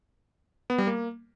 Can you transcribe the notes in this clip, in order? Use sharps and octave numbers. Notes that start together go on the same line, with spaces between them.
B3
G3
A#3